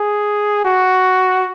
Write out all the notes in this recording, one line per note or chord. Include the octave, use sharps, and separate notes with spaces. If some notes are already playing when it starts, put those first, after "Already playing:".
Already playing: G#4
F#4